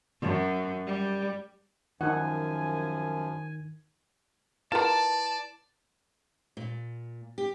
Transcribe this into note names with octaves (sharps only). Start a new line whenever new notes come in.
F#2
G3
F#2 D#3 F3 D#4 F#5 G#5
E4 F4 A#4 B4 D5 A5 C6
A#2
G4